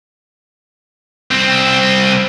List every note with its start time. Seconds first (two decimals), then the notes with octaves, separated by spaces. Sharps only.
1.31 C2 C4